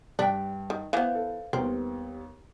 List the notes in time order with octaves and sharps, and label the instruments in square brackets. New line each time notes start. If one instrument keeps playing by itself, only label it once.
[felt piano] G2 [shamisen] D4 [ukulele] B4 E5 G5
[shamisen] D#3
[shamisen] E3 B3 [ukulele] B4 C5 F5
[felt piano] A4
[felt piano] D#2 G3 B3 [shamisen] C4 [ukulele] A#4